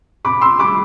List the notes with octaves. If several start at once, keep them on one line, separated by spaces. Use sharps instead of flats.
C3 B5 D6
C6 E6
G3 B5 D6